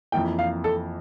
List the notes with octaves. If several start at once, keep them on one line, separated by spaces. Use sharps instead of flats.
F2 E3 A#3 E4 G5
F5
A4